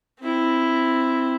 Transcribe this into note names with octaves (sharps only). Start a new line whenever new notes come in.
C4 E4